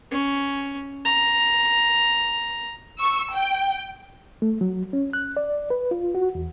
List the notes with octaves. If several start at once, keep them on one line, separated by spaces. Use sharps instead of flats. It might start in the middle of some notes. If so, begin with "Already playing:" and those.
C#4
A#5
C#6 E6
G5
A3
F#3
C#4
F#6
D5
B4
F4
F#4
E2